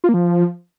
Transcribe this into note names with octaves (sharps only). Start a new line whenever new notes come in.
F4
A#3
F3